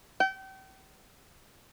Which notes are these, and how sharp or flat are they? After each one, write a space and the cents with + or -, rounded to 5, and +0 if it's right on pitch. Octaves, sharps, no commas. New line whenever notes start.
G5 -35